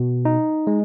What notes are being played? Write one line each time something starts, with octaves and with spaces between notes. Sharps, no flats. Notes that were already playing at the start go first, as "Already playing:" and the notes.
Already playing: B2
D#4
G#3